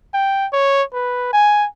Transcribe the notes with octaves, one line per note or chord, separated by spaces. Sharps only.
G5
C#5
B4
G#5